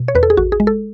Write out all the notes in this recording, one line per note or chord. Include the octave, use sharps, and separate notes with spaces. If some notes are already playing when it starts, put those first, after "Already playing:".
Already playing: B2
C#5
E2 B4
A4
G#4
A1 F#4
G#4
G#3
A4